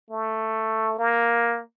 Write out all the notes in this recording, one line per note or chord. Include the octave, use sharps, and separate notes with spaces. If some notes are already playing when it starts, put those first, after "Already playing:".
A3
A#3